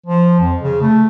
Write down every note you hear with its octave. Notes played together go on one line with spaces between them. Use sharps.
F3
F2
C#3
A3